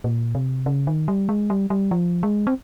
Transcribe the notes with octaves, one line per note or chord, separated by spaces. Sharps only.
A#2
C3
C#3
D#3
G3
G#3
G3
G3
F3
G#3
C4